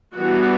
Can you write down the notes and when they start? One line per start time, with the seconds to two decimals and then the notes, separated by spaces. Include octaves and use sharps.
0.15 E3 G3 B3 D4 F#4